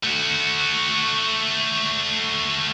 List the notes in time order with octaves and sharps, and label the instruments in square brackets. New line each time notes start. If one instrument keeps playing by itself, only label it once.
[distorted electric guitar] A3 F#4